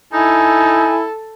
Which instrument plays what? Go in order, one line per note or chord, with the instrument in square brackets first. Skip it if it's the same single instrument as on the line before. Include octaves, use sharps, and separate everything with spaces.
[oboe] D#4 [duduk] E4 [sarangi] A4 [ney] G#5